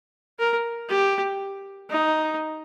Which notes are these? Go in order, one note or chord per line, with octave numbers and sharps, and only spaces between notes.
A#4
G4
D#4